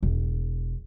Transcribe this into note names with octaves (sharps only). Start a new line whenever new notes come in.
E1